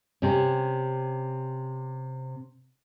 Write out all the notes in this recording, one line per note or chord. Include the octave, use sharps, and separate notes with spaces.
C3 C#4